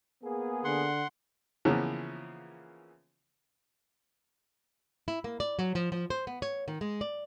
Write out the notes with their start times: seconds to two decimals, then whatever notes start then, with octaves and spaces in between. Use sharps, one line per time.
0.23 A#3 B3 G#4
0.65 D3 F#5 C6
1.65 C#3 E3 F3 A#3 B3 C#4
5.08 E4
5.24 A#3
5.40 D5
5.59 F#3
5.75 F3
5.92 F3
6.10 C5
6.27 B3
6.42 C#5
6.68 D#3
6.81 G#3
7.01 D5